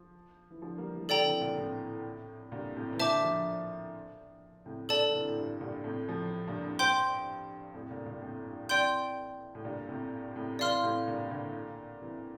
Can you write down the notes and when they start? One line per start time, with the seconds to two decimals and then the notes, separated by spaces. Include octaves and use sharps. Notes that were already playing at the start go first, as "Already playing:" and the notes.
Already playing: F3
0.51 E3
0.62 D3 F3
0.78 G3 A#3
0.94 E3 G3
1.09 D3 F3 A4 D5 G5 A#5
1.26 C3 E3
1.41 A#2 D3
1.57 A2 C3
2.52 G2 A#2
2.76 A2 C3
2.92 E3
2.99 A#2 D3 C5 E5 A5 D6
3.23 D3 F3
4.66 A2 C3
4.89 A#2 D3 A4 D5 A5
5.10 D3
5.14 C3 E3
5.28 A2
5.37 G2
5.61 G2 A#2
5.84 A2 C3
6.08 F3 A3
6.47 G2 A#2
6.63 G2
6.79 C5 G5 C6 G6
7.74 F2 A2
7.90 G2 A#2
8.06 G2 A#2
8.22 A2 C3
8.46 G2
8.69 C3 E3 D5 G5 C6 G6
9.55 A2
9.64 G2 A#2
9.88 A2 C3
10.36 A2 C3
10.59 C3 E3 D5 F5 C6 F6
10.83 A2 C3
11.07 G2 A#2
11.31 A#2 D3
12.02 C3 E3